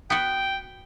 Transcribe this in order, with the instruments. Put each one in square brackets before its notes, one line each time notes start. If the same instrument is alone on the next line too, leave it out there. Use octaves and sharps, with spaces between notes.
[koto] B3 F#4 [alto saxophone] G5